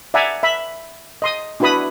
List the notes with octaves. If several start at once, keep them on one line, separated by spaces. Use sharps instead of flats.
D5 E5 F#5 G#5 A#5
E5 B5
D#5 C6 D#6
D4 E4 F#4 B4 B5 D#6